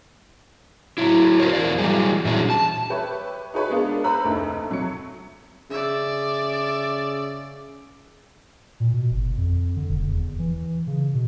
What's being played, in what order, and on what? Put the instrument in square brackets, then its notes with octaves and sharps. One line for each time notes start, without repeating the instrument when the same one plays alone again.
[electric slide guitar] F#3 E4
F#4 G4 A#4 C5 C#5
E2 C#3 A#4 D5
E3 F#3 G3 G#4
A#2 E3 F#3 C#4 D4 G#4
A5
[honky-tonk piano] G4 B4 C#5 E5
D#4 F#4 G#4 B4 C#5
G#3 A#3 B3 D4 F4
B4 C5 A#5 B5 E6 F#6
F1 D2 D3 D#4
C3 F#3 C#7
[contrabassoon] C#3 [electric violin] D5 E5
[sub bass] A#2
B2
G1
F2
D3
E1
E2
E3
C#3
B2